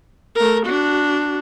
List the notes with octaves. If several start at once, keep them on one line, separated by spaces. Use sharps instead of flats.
A3 A#4
D4 F#4